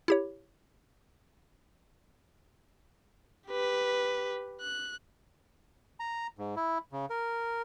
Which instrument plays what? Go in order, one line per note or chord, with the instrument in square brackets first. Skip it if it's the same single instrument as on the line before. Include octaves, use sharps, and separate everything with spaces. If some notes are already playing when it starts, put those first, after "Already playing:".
[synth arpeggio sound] E4 G4 C#5
[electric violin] G4 B4
F#6
[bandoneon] A#5
G#2
E4
C#3
A#4